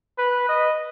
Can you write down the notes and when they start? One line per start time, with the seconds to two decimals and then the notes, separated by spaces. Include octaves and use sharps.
0.19 B4
0.49 D#5